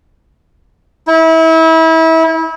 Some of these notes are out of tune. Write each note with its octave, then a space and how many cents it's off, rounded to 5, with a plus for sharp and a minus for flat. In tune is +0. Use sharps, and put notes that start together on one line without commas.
E4 -30